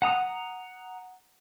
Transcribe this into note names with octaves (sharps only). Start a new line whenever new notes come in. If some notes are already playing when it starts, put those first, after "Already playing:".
F#5 A#5 D#6